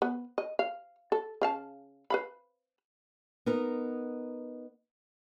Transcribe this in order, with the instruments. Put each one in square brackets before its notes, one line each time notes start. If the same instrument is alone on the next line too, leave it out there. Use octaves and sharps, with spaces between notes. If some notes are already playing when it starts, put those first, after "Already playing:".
[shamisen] B3
D#5
F5
A4
C#3 F5 A5
B4 F5 B5
[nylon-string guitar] B3 D#4 A#4